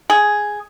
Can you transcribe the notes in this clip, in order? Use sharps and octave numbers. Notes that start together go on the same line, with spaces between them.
G#4